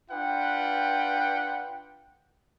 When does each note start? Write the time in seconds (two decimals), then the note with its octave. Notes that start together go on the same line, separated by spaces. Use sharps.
0.10 D4 F4 B4 F#5 G5